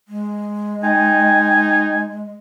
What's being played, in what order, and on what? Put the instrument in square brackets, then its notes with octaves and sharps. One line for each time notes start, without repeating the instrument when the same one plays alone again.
[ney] G#3
[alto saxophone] D#4 [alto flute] G5 [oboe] G#5